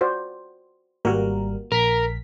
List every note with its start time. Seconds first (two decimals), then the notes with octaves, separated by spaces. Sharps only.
0.01 F#4 C5 D5
1.05 G#1 G3 A#3 F#4 A#4
1.72 A#1 A#4 B6